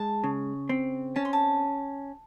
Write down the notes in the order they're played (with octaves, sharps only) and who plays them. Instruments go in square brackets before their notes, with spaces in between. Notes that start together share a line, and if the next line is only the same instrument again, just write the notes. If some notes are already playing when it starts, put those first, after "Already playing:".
Already playing: [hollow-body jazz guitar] G#3 [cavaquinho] A5
[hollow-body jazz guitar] C#3
C4
[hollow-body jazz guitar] C#4 [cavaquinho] A5
[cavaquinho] C6
A5